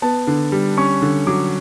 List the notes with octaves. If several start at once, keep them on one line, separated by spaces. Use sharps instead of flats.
B3 A5
D3
G3
C#4 C#6
D3
F#3 D6